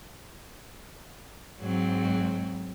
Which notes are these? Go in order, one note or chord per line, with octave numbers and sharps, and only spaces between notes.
G#2 F#3 C4